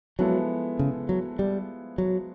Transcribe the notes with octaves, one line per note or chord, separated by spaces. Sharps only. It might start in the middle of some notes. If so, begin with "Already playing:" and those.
F3 F#3 G#3 B3 E4 A4
C#3
F#3
G3
F#3